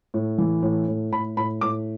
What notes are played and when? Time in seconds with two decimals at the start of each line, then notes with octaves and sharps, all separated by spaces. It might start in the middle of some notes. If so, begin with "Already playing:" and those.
0.14 A2
0.38 E3
0.63 A2
0.88 A2
1.12 A2 B5
1.37 A2 B5
1.61 A2 D6